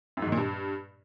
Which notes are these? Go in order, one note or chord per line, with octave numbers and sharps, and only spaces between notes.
F#2
G#2
D#3
A#2
G2